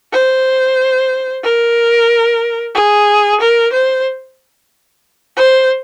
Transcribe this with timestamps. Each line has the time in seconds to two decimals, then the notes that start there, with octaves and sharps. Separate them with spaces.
0.13 C5
1.43 A#4
2.75 G#4
3.41 A#4
3.73 C5
5.37 C5